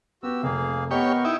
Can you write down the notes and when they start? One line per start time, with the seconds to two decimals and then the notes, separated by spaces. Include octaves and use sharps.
0.23 B3 F#4 G4 E6
0.43 F1 A#3 G#4 F5
0.91 B3 G4 A#4 C#5 D#5 C#6
1.25 D#4 E4 G5